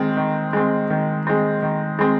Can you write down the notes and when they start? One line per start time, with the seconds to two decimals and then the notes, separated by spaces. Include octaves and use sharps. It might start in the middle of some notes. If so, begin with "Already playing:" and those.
Already playing: D#3 G#3 C4
0.17 D#3
0.53 G#3 C4
0.90 D#3
1.27 G#3 C4
1.63 D#3
1.99 G#3 C4